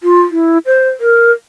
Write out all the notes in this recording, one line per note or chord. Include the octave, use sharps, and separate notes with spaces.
F4
E4
C5
A#4